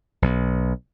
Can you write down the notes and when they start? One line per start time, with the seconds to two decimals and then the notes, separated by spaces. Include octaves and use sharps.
0.22 B1